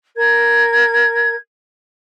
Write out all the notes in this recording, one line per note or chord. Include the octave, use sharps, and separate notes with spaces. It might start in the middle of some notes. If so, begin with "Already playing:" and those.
A#4 G#6